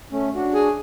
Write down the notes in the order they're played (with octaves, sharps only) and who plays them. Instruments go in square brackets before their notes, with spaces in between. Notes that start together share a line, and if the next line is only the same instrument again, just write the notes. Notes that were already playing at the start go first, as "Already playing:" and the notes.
[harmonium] A3 C#4
D4 F#4
[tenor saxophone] G#4